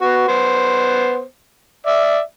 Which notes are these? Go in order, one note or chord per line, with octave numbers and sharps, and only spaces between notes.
B3 F#4
B3 C5
D5 E5